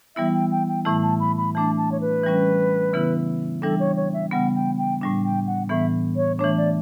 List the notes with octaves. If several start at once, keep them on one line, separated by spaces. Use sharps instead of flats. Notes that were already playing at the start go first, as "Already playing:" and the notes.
E3 G3 B3 E4 E5
G5
G5
G5
A2 E3 A3 E4 A5
A5
B5
B5
E3 A3 D4 A5
A5
C#5
B4
E3 G3 C#4
C#3 E3 B3 E4
E3 G3 D4 A4
C#5
C#5
E5
C#3 G3 B3 F#5
G5
G5
A2 G3 D4
G5
F#5
A2 E3 B3 E5
C#5
E3 A3 D4 C#5
D5